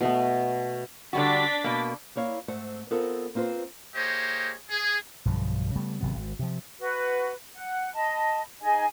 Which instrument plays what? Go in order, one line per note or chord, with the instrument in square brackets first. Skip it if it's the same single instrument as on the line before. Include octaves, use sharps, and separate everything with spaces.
[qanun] B2 A3 B3
[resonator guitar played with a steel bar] D3 G3 F#4 [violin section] D4 A6 B6
[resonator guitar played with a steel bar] B2 A#3
[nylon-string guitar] A#3 E4 C#5 F5
G#2 A3 C4 F#5
B3 C4 F4 A4 A#4
A#3 C4 F4 B4 C5
[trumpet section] A#3 G4 G#4 C5 C#5 D#5
G#4
[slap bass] B1 G2 D3 F3
C#3 G3 A3 B3
G#1 C3 F#3 B3
G#1
C3 F3
[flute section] F#4 B4
F#5
D#5 A5 B5
D#4 G#4 D#5 G#5